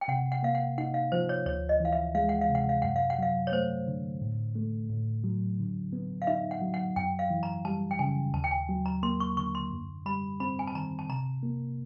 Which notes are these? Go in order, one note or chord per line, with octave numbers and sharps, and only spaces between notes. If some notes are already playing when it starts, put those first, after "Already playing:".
G5
C3 F#5
F#5
A#3 F5
F#5
D#4 F#5
F5
F3 C5
C#5
D2 C#5
D#5
E3 F5
E5
G#3 F5
F#5
F5
C3
F#5
F5
F#2 F#5
F5
F#5
F#3 F5
C#5
A3 C5
D3
A2
A3
A2
F#3
D3
B3
F5
D#4 E5
F#5
F#3
F#5
F#2 G5
F5
E3
A#5
G3 A5
G5
C#3 G#5
D#2 A5
G5
G#5
F#3
A#5
A#3 C6
C#6
D3 C#6
C6
F#2
G3 B5
C4 B5
G#5
A5
D#3 A#5
A5
C3 A#5
A#3